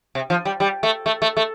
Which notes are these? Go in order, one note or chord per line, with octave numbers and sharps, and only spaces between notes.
C3
F3
G3
G3
A3
A3
A3
A3